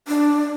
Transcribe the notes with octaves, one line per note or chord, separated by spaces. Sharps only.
D4